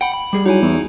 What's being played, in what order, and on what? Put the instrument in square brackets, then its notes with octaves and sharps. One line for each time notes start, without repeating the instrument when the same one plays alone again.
[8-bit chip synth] F#5 B5 [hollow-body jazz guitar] G5
[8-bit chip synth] B5
[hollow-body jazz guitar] G3 G#4
[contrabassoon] F#3 [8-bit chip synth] D#4 E4 G#5
[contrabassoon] E2